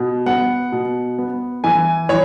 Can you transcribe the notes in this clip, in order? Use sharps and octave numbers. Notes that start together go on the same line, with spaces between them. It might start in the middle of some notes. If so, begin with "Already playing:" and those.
Already playing: B2
B3 F#5
B2
B3
E3 G#5
E3 C#5